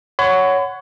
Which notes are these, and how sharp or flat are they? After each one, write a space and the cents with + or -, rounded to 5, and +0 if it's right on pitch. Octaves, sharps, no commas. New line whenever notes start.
C#5 +10 F#5 +0 B5 +45